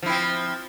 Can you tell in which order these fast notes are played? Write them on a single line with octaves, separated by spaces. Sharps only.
F3 E4 C4